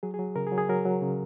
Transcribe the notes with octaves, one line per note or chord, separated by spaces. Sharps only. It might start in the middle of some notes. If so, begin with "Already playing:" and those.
F#3 G#4
G#4
F#3
C#3 A#4
G#4
F#3
G#4
F#3 A#4
F#3
C#3